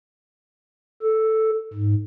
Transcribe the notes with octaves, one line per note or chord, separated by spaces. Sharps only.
A4
G#2